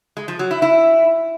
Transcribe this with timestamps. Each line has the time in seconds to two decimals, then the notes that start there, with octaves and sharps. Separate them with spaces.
0.17 G#3
0.28 F3
0.39 F#3
0.51 E4
0.62 E4